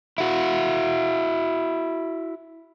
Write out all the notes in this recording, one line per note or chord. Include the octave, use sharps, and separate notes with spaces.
E4 F#4